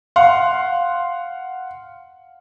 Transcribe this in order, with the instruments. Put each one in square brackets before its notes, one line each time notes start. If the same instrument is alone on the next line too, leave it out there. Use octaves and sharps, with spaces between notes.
[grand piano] F5 F#5 C6